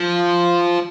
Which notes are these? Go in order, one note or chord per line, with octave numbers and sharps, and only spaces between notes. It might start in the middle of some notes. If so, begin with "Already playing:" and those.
Already playing: F3